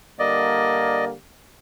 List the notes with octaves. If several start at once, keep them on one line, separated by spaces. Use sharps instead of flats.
D3 G3 A#3 D5 D#5